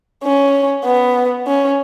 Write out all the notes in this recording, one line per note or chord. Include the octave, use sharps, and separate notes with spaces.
C#4
B3
C#4